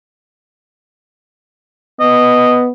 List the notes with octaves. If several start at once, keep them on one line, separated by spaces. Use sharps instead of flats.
B3 D#5